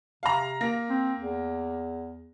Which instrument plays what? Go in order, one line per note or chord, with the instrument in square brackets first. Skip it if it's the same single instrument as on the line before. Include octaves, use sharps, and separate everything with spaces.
[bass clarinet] C3 [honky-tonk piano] F5 A#5
[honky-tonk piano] A#3 A#6
[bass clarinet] C4
E2